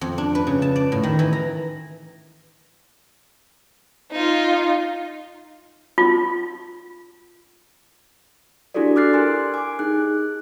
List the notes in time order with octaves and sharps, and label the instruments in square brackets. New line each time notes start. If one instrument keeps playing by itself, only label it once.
[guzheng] F2
D4
B4
C#3
A5
D5
A2
D#3
E3
A#5
[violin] D#4 F4
[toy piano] F4
[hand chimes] D4 E4 F#4 G4 A4 D5
D6 F6 F#6 A6 C7
G4 A#4 G#5 C6
G#5 D6
D#4 G#4 F#6